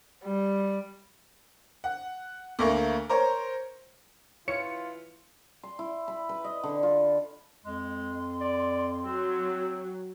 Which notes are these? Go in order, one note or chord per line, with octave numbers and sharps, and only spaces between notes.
G3
F#5
D2 A3 A#3 C#6
A#4 C5 C#5
E3 F4 C#5 C#7
C6
E4
B5
B4
D#5
D3
F4
F2 G#3 C6
D5
F#3 C4